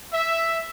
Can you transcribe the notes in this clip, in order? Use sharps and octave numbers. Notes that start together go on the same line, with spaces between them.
E5